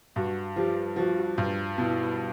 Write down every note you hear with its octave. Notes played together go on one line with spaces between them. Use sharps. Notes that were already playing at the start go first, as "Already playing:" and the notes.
G2 F#4
F3 G4
F3 F#4
G2
B2 E4